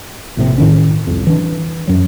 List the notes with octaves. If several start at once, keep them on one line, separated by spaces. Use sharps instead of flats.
A#1 A2 C3
A2 D#3 C#4
C2 F2
E3 D4
F#2 F#3